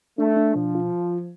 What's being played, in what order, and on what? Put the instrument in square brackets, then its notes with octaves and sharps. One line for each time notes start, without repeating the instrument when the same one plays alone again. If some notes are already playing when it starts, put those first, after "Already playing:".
[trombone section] A3 [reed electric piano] D4
[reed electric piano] D4
[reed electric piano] B2 [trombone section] F3
[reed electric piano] F4